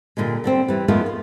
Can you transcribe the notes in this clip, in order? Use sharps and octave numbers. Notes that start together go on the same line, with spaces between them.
A#2 D3 G3 G#3
D3 G3 C4
E3 G3
F#2 D#3 G#3 A3 B3 F4
F4